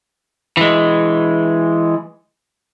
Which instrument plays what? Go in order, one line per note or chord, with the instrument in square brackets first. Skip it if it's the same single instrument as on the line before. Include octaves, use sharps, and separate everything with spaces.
[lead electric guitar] E3 G#3